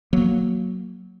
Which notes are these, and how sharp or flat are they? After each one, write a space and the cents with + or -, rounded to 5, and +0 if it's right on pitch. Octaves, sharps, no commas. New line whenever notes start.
F#3 +0 A#3 +0